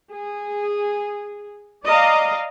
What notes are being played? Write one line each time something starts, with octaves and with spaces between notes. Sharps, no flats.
G#4
D5 D#5 F5 A#5